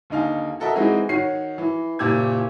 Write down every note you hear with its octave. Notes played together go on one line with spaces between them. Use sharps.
D#2 D3 D#4 F5 G#5
F#4 A4 A#4 D#5 E5
E3 G#3 C4 D#4 F#4 G#4
D#3 F#4 C#5 C7
E3
F#1 A#2 G4 D6 E6 G#6